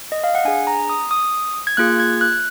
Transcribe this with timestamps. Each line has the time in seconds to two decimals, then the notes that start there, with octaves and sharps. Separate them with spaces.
0.12 D#5
0.24 F5
0.35 F#5
0.45 D4 G#4 G#5
0.67 A#5
0.89 D#6
1.11 D#6
1.67 G#6
1.77 A#3 F4 G#4 F#6
2.00 G#6
2.21 F#6